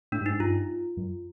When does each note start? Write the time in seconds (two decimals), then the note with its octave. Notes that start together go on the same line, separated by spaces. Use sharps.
0.12 A2 D4
0.21 G2
0.26 G#2 D#4
0.40 G2 F4
0.97 F#2